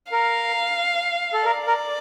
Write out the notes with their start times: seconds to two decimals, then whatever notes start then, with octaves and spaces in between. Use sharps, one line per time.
0.12 A#4 F5
1.33 A4
1.45 A#4 D5
1.67 A#4